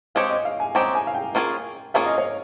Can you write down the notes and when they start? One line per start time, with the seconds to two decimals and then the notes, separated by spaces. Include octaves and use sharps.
0.15 G#3 C4 G4 C#5 F5
0.30 D#5
0.45 F5
0.60 G#5
0.75 G#3 C4 G4 C#5 A#5
0.95 G#5
1.07 F5
1.15 G5
1.35 A#3 C#4 F4 G#4
1.94 A#3 C#4 F4 G#4 F5
2.06 D#5
2.18 C#5